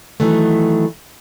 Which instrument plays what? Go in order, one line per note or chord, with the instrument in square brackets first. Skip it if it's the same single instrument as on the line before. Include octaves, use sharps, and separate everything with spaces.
[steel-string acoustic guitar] D#3 E3 F#3 A3